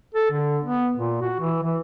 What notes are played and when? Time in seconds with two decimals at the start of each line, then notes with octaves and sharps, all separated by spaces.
0.14 A4
0.31 D3
0.64 B3
0.97 A#2
1.22 F#4
1.40 E3
1.63 E3